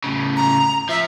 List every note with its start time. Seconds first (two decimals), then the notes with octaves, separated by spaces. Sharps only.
0.04 A2 C#3
0.37 A#5
0.89 F3 E5